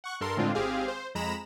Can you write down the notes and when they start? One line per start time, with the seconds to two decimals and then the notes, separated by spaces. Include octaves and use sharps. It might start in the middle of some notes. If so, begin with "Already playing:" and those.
0.04 F#5 C#6 F#6
0.21 G2 A4 A#4 C6
0.37 A2 D3 G#3 C4 D4 F4
0.55 G#1 C4 G4 G#4 F5
0.88 C5
1.15 F2 G#3 A#5 B5 E7